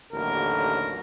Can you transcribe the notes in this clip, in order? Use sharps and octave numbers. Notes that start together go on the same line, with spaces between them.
A1 D#2 D3 F#3 A#4